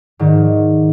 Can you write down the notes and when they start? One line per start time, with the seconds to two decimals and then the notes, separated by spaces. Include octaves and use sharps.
0.19 G#2 D#3